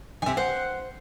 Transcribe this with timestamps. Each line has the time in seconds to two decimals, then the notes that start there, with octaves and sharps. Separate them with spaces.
0.22 C3 D#3 E5 G#5
0.37 C5 F#5